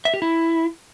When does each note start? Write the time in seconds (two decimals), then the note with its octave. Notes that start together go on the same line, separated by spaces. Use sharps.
0.05 E5
0.14 G4
0.22 E4